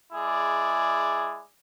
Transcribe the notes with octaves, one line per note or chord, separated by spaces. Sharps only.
G#3 E4 G#4 D5